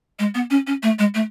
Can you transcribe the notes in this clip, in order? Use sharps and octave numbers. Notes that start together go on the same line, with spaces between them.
G#3
B3
C#4
C#4
A3
G#3
A3